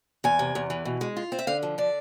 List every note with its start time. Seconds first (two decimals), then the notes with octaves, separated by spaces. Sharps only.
0.24 E2 G#5
0.39 C3
0.55 E2
0.70 E3
0.85 B2
1.01 G#3
1.17 F4
1.32 C4
1.39 E5
1.47 D3 F5
1.63 F3
1.78 D3 D5